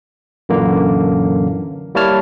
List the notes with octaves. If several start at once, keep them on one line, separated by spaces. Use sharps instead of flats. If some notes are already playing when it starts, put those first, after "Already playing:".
F#2 A#2 D3 E3 A#3
G3 A#3 E4 C#5 A5 F6